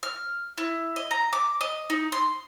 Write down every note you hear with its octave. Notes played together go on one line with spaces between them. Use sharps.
F6
E4
D#5
A#5
D6
D#5
D#4
C6